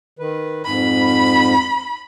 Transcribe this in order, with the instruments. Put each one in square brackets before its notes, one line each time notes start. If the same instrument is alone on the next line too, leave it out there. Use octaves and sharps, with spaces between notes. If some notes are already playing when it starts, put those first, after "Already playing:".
[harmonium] D#3 B4
[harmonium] F2 G#2 [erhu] B5